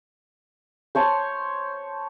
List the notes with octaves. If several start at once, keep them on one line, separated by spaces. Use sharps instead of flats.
C5 C#5 A5 C6